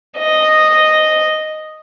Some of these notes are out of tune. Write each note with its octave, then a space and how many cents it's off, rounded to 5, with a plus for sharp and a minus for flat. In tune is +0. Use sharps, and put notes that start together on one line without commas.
D#5 -5